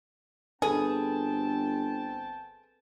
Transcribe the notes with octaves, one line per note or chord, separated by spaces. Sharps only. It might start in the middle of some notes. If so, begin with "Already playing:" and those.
G1 C4 G#4 A4 B4 G5 A5